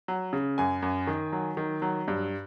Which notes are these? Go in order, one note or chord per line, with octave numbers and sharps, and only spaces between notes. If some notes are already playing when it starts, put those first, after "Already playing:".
F#3
C#3
F#2 G#5
F#2
D#3
F#3
D#3
F#3
G2